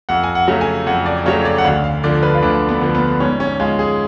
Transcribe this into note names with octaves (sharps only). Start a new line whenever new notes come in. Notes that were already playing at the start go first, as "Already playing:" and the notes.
F2 F#5
G#5
F#5
C#3 F#3 A3
G#5
F2 F#5
D5
C#3 F#3 A3 C#5
D5
F#5
D2 F5
F5
D3 F3 D5
B4
F4
D2 D4
B3
D3 F3
B3
G#2 C#4
C#4
G#3 F4
G#4